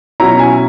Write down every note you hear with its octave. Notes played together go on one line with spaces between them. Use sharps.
B2 F#3 C#4 E4 A#5
G#5